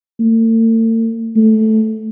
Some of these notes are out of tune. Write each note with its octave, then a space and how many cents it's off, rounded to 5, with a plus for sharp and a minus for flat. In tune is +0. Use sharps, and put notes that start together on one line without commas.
A3 +45
A3 -10